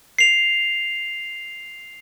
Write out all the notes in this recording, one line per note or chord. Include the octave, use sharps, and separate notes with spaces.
C7 F7